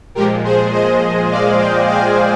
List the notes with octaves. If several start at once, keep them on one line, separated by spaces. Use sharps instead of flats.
A#2 F3 G#3 G4 A#4
G#4 C5
C5 D#5
D5 F5
D#5 G5
F5 G#5